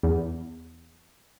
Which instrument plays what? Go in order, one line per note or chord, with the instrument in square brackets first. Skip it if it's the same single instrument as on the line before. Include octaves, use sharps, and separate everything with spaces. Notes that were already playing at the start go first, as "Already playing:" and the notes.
[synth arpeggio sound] E2